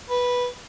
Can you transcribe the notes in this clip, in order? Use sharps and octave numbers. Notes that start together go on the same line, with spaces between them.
B4